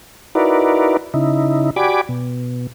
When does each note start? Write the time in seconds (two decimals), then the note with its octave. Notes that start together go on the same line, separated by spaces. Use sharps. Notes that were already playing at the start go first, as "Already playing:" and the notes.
0.35 D#4 E4 F#4 A#4 B4 D5
1.14 C#3 D#4 E4
1.76 F#4 G4 D5 G#5 B5 D6
2.09 B2